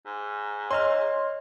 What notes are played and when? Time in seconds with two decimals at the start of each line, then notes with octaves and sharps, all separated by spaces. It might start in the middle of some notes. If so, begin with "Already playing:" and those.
0.06 G#2
0.71 C#5 D#5 C6 F6